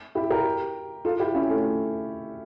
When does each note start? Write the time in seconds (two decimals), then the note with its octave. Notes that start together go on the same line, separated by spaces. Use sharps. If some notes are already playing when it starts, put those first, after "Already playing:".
0.15 E4 G4
0.30 G4 A#4
1.05 F4 A4
1.20 E4 G4
1.35 C#4 E4
1.49 A3 C#4